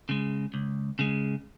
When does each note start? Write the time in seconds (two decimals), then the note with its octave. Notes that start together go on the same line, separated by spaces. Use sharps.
0.09 C#3 G#3
0.54 C#2
0.99 C#3 G#3